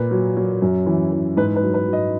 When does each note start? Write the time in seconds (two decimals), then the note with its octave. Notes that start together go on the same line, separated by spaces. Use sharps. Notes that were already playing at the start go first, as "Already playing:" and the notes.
Already playing: A#2 B4
0.11 F#3
0.37 F#3
0.62 F#2
0.86 E3
1.12 E3
1.37 G#2 B4
1.56 B4
1.63 F#3
1.74 B4
1.87 F#3
1.93 D#5